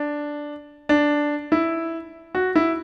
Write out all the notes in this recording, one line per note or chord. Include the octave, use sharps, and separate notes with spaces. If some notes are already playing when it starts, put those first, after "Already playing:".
Already playing: D4
D4
E4
F#4
E4